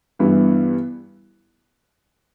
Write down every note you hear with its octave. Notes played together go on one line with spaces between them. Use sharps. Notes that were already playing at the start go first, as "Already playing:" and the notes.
G2 E3 B3 E4